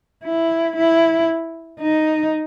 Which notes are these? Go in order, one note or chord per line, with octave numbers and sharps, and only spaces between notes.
E4
E4
D#4